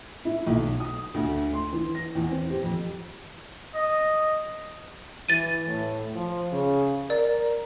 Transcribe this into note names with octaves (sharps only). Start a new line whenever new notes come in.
E4
B1
D#6
D2
C6
E3
A#6
E2
C4
G4
F2
D#5
E3 A6 D#7
A2
F3
C#3
A#4 D5